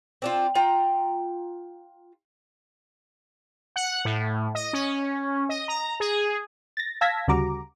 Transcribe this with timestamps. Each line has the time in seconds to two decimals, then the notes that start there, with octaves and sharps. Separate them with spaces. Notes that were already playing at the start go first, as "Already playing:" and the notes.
0.22 C4 D4 F4
0.55 F4 G5 A#5
3.76 F#5
4.05 A2
4.55 D#5
4.73 C#4
5.49 D#5
5.68 A#5
6.00 G#4
6.77 A6 A#6
7.01 F5 A5 E6 G#6 A#6 B6
7.28 D2 C#3 G3 F#4 A#5 D6